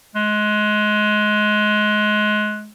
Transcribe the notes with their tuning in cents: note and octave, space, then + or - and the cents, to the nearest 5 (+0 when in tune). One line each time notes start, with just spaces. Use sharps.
G#3 +25